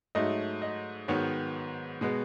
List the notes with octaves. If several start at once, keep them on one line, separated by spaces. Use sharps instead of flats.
G#2 F#3 A3 D#5
D#5
G#2 D#3 F#3 B3 C#5
B2 G#3 B3